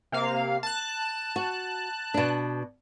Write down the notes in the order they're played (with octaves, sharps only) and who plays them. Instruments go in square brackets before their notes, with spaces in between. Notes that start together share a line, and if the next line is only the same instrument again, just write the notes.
[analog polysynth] C3 A#3 F5
A5 F#6
[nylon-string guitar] F#4
B2 D4